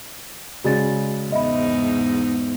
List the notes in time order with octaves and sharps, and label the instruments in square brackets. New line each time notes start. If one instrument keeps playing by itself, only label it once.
[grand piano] C#3 G#3 [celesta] F#4 D5 A6
[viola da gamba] E2 G#2 D#4 [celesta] D#5 E5 B5